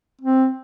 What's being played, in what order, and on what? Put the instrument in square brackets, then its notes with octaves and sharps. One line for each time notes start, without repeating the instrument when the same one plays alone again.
[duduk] C4